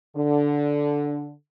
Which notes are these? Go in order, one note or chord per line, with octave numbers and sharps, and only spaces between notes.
D3